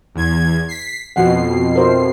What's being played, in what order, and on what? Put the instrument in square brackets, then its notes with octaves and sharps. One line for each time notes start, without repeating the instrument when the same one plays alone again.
[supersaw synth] E2 G#6
B6 C7
[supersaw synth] F2 B2 C7 [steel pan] F#5
[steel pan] A#4 C5 E5